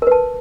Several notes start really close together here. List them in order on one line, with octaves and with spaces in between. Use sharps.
A#4 B4 A5